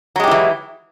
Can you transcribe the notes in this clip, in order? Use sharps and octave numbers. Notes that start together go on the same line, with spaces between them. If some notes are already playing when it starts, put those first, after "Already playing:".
E3 F#3 G#3 E4 G4